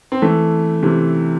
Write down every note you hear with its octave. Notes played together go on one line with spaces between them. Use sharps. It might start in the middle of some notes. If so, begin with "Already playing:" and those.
C4
E3 A3
C3 E3